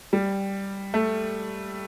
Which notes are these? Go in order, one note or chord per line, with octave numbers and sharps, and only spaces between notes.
G3
A3